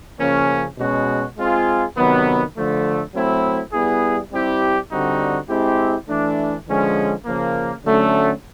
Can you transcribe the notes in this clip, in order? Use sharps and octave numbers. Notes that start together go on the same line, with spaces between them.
C#3 F3 A#3 C#4
B2 G#3 C#4 F#4
G#3 C4 F4 G#4
C3 D#3 F#3 B3
D3 F3 A3
F#3 A3 C4 E4
G3 B3 E4 G#4
G3 C4 E4 G4
D3 G3 C4 D#4 F#4
G#3 C4 E4 G4
E3 A3 D4
D3 F3 G#3 C#4
C#3 F3 A#3
D3 F#3 A3 C#4